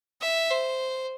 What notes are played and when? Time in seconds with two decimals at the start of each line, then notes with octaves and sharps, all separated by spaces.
0.21 E5
0.51 C5